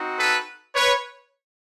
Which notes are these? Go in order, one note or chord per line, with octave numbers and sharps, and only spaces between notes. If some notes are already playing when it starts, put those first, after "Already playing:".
Already playing: C4 D#4 F#4
A4 B4
B4 C#5